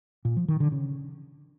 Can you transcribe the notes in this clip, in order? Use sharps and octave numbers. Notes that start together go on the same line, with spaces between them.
A#2
F3
D#3
D3
C#3